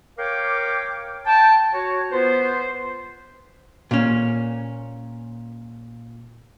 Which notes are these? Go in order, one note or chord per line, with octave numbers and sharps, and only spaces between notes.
A#4 C#5 F5 G5 D6
G5 A5
F#4 C#5
B3 F4 B4 C5
A#2 C#4